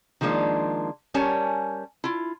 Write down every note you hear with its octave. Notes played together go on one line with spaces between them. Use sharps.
D#3 F3 G#3 A#3 D4
G3 C#4 A#4 C#5 G#5 A5
E4 F4